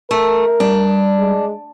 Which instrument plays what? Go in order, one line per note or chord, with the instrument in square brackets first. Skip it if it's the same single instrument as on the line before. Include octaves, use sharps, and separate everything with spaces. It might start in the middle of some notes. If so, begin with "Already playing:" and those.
[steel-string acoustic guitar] A3 [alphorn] A#4
[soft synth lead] G3 [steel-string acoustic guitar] D4
[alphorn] G#3